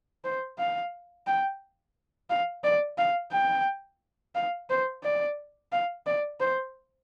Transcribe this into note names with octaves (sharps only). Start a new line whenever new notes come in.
C5
F5
G5
F5
D5
F5
G5
F5
C5
D5
F5
D5
C5